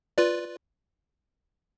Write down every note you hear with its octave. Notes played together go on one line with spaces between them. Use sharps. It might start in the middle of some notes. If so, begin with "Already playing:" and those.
F4 B4 D5